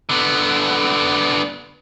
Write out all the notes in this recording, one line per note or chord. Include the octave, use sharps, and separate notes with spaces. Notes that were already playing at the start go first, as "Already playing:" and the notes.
D3 B3